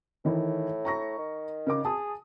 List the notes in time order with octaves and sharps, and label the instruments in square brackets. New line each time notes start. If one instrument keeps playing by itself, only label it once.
[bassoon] A2 [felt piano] D#3 E3
[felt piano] A#5 C#6 A#6
[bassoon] D#3
[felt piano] C#3 A#4 D6
[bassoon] G#4 [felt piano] A5 D#6